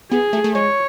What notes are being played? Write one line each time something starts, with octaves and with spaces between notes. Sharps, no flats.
B3 G#4
A3
A3
G#3 C#5